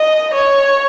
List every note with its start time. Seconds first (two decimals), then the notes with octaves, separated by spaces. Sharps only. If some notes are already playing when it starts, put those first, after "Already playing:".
Already playing: D#5
0.35 C#5